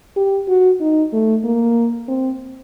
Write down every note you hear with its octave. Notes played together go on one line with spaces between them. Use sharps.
G4
F#4
D#4
A3
A#3
C4